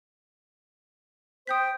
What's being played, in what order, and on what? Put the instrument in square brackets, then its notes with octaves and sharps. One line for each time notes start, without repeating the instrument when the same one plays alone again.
[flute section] C5 G5 [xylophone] D#6 G6 B6